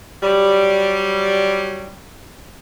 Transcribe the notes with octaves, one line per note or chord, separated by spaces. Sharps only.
F#3 G3